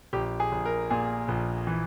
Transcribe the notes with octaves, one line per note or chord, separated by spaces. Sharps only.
A#1 G4
G#4
A#1
A#4
A#2 G#4
A#1
E3